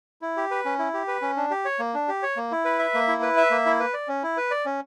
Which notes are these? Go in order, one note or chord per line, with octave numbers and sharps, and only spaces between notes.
E4
G4
B4
C#4
E4
G4
B4
C#4
D4
G4
C#5
A#3
D4
G4
C#5
A#3
E4
B4
E5
A#3
E4
B4
E5
A#3
E4
B4
D5
C#4
E4
B4
D5
C#4